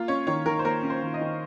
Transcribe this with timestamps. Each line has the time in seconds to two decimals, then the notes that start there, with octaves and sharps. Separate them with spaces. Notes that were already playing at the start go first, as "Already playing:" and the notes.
Already playing: A#3 F4
0.08 C#4 C#5
0.27 D#3 C#5
0.46 D#3 A#4
0.59 C5
0.65 A#3 A#4
0.83 C#4
0.90 C5
1.03 D#3
1.14 D#5
1.21 D#3